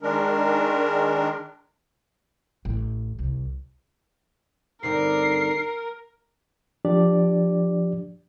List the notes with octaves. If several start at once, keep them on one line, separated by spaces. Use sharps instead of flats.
D#3 G#3 D4 A#4
A1
C2
G2 D3 C4 D#4 A#4 C7
F3 D4 G4 D5